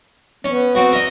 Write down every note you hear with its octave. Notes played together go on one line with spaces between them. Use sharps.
B3 C#4
C4 F#4
A#4 D#5